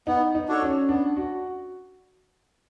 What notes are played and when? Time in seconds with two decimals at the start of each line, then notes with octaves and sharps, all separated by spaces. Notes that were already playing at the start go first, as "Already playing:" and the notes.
0.07 B3 D#4
0.35 D#4
0.48 D4 F#4 A4 C#5
0.62 C#4
0.89 B3 D4
1.16 F#4